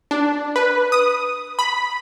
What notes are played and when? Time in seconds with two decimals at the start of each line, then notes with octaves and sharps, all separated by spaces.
0.11 D4
0.56 B4
0.92 D#6
1.59 B5